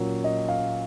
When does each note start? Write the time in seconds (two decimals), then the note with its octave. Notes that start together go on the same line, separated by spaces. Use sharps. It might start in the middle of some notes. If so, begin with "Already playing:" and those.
Already playing: A#2 F#3 A#3 C#4 F4
0.24 D#5
0.48 F5